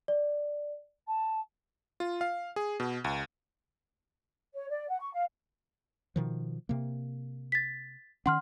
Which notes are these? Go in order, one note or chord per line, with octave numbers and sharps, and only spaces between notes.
D5
A5
F4
F5
G#4
B2
C#2
C#5
D5
F#5
C#6
F5
B2 D#3 F3
C3 A#3
A6 B6
D#3 C#4 F#5 C6 F6